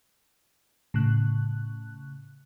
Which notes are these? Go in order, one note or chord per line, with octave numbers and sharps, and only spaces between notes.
A2 C#3 F#6